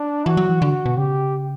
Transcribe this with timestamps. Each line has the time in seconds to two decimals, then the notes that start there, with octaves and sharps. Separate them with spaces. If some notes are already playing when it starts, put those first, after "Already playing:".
Already playing: D4
0.26 E3 F#4
0.37 F#3
0.50 E3
0.62 D3 F#4
0.86 B2
0.98 C#3 G4